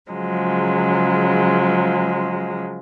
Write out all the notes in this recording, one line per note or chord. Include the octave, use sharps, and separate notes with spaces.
C#3 F3 F#3 G#3